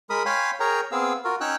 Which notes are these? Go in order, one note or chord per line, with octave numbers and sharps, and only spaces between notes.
G#3 A#4 B5 D#6
C#5 F5 G5 G#5 B5 C6
G#4 A#4 C#5 G5 A#5
B3 C4 G#4 F5 E6
F4 F#4 A#4
C#4 D#4 C#5 G5 E6 F#6